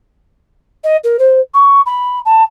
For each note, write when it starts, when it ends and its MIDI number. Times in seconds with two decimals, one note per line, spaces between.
0.84 0.96 75
1.04 1.17 70
1.19 1.40 72
1.54 1.81 85
1.86 2.20 83
2.25 2.43 81